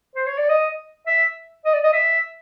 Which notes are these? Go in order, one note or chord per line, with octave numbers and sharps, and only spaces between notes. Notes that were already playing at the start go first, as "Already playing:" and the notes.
C5
C#5
D5
D#5
E5
D#5
D5
D#5
E5